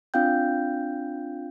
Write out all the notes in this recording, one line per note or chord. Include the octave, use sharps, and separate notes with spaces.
C4 D4 F4 F5 G5 G6